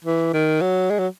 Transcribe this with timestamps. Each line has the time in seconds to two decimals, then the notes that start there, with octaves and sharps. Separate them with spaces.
0.04 E3
0.33 D#3
0.61 F#3
0.90 G#3
0.99 F#3